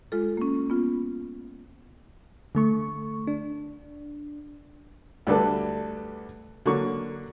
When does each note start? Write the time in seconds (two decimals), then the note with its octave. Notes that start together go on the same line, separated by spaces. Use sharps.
0.12 G#3 F4 A4
0.37 A#3 C#4
0.70 B3 F4
2.55 D3 A3 C#6
3.27 D4
5.27 D2 G3 D4 A4 B4 A5
6.66 D3 F#3 A#3 C#6